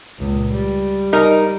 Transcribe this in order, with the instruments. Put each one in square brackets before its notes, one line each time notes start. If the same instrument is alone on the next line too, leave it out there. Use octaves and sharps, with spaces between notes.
[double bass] C#2 A#2
G3
[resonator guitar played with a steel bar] D#4 A#4